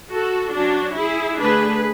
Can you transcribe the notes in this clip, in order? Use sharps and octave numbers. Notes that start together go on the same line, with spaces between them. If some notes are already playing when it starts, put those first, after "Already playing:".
F#4 A4
F#3 C#4 D4 F#4
E4 G#4
D3 A3 D4 G#4 B4